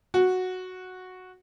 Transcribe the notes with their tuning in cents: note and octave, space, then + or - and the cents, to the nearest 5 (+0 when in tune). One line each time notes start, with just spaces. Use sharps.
F#4 -5